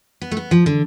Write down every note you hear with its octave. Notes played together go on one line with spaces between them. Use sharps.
B3
A3
B3
F3
D3